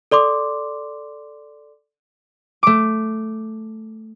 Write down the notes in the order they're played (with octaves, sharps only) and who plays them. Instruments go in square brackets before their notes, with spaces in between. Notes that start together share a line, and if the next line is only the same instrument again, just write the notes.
[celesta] A4 D5 C6 D6
[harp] A3 D6